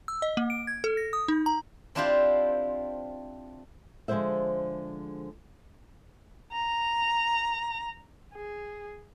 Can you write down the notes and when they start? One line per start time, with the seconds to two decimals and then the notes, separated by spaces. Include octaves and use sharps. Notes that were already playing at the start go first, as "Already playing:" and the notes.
0.08 E6
0.22 D#5
0.37 A#3
0.50 D7
0.67 G#6
0.84 A4
0.97 A#6
1.13 D#6
1.28 D#4
1.46 A#5
1.95 C4 D4 E4 F4 G4 C5
4.08 D3 F3 G#3 G#4 C5 E5
6.53 A#5
8.34 G#4